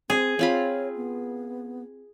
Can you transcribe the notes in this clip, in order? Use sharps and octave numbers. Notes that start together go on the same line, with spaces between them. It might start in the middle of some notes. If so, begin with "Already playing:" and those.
C4 G#4
C4 F4 C#5 B5
B3